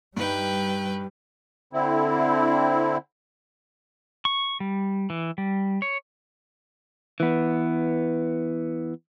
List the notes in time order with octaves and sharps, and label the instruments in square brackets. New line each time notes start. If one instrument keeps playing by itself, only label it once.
[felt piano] G2 D#4 [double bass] G3 [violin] B4 G5
[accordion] D3 C4 E4
[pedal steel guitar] C#6
G3
E3
G3
C#5
[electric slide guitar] E3 B3